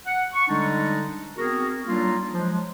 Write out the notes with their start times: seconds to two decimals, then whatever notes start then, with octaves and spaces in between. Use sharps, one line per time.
0.06 F#5
0.33 C#6
0.49 D3 G3 G#3 D4 D#4
1.36 B3 C4 F#4 G#4 A#4
1.85 F#3 G3 A#3 D4 D#4 F4
2.31 F3 F#3 G#3